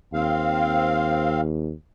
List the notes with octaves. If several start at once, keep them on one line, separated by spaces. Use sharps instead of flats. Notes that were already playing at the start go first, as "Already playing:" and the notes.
D#2 C4 F5